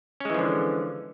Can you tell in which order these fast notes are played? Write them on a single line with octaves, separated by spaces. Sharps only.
C#4 G#3 E3 F3 D3